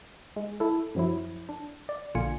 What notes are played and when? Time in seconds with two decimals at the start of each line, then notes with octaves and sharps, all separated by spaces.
0.36 G#3
0.60 E4 A4
0.95 F#2 F3 F#3 E4
1.49 D4
1.89 D5
2.15 A#1 A#2 D3 F4 G#5 C#7